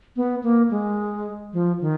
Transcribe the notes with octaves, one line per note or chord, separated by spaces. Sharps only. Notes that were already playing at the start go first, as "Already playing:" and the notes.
B3
A#3
G#3
F3
D#3